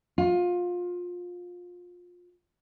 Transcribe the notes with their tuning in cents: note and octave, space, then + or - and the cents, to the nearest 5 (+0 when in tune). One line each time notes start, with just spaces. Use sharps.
F4 +25